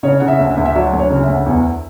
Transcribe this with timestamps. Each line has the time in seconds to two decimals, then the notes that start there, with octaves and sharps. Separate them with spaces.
0.03 C#3 C#5
0.20 C#3 F#5
0.28 E5
0.39 D2
0.51 E5
0.57 D2
0.65 E5
0.75 F#3 D5
0.93 D2
0.99 C#5
1.10 C#3
1.23 E5
1.29 D2
1.46 E2